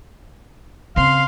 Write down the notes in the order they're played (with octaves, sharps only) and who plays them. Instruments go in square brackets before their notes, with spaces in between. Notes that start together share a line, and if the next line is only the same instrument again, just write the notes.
[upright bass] C#3 C4 [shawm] F5 [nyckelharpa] C6